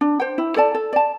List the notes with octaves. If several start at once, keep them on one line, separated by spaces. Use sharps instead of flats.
D4
C5 G5
E4
A4 D5 A5
A4
D5 A5